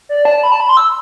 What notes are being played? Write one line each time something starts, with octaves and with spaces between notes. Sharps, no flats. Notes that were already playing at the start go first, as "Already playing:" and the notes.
D5
A5
B5
A5
B5
C6
E6